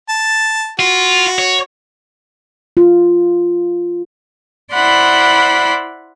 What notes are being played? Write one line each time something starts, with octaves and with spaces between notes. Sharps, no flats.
A5
F4 F#4
C#5
F4
E4 C5 D5 F#5 B5 C6